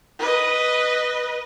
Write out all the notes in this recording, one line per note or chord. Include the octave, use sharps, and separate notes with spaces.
B4 D#5